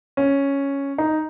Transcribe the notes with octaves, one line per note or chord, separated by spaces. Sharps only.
C#4
D#4